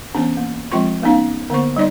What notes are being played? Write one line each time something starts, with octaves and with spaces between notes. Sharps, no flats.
E3 B3 C#4 D4
A#3
F3 G#3 C4 F4 C#6
A3 B3 C#4 D#4 F5
D3 A#3 B3 C5 C#6
G3 D#4 D5 D#5